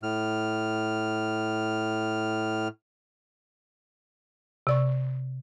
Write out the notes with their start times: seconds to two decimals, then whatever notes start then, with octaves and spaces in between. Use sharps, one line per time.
0.03 A2 F6
4.67 C3 D5 C#6